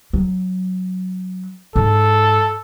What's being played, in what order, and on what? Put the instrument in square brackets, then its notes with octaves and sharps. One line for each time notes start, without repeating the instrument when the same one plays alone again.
[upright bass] F#3
[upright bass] G#2 [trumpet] A4